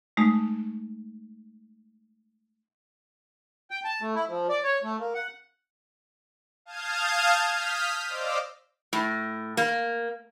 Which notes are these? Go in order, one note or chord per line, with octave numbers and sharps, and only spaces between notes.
G#3 A3 D#4
G5
A5
A3
E4
F3
D5
C#5
A3
A#3
F#5
F5 A5 D#6 F6 G6 G#6
D#6 F6 G6 B6
C5 D5 D#5 F5 D6 E6
A2
A#3